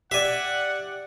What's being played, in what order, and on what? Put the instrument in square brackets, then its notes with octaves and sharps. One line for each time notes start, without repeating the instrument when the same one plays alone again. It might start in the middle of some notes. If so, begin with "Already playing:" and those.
[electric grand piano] G4 D5 [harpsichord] E5 G#5 [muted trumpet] F#5